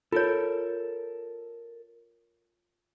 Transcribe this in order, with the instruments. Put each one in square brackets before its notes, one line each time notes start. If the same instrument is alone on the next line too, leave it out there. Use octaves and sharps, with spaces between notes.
[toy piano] F4 C#5 [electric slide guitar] A4 A#4